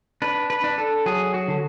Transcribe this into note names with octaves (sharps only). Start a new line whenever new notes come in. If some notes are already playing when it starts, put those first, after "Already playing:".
D4 B4
B4
D4
A4
F#3 G#4
F#4
D3